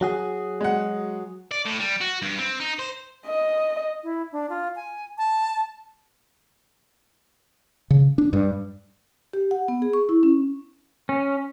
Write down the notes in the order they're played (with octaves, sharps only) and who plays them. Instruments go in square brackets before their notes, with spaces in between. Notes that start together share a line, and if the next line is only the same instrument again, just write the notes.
[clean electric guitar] F#3 F#4 G#4
[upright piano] G#3 F#5
[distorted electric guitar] D5
A2
G3
F#4
G2
C4
D#4
C5
[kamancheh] D#5
[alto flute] E4
D4
F4
G#5
A5
[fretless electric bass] C#3
D4
G2
[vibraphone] G4
F#5
B3
G#4
C#6
E4
C#4
[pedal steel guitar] C#4